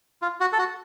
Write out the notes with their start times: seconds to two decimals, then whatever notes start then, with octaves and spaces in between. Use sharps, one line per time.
0.22 F4
0.40 F#4
0.53 A4
0.58 F#4